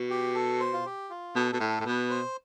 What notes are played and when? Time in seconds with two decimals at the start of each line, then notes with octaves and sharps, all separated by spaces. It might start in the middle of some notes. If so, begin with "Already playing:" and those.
Already playing: B2
0.10 G4
0.35 A4
0.60 C5
0.73 F4
0.85 G4
1.10 F4
1.35 B2 A4
1.52 B2 A4
1.60 A2
1.69 A4
1.81 A2
1.85 B2 B4
2.10 C5